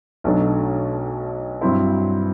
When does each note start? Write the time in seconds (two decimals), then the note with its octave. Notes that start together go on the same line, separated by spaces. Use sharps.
0.24 B1 B2 F#3 A3 D4
1.61 G2 F#3 C4 E4